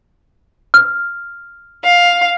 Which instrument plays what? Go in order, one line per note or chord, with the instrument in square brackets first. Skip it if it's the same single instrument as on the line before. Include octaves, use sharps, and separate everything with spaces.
[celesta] F6
[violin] F5